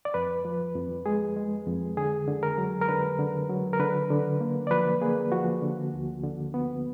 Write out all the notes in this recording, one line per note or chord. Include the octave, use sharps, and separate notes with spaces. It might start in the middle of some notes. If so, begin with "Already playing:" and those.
D5
F2 B4
F3
F2
G#3 G#4
G#3
F2
D3 G#4
D3
A#4
F#3
A#4
D3 B4
D3
F#3
A#4
D3 B4
D3
A#3
D5
F3 B4
A#3 G#4
F3 F#4
D3
D2
D3
B3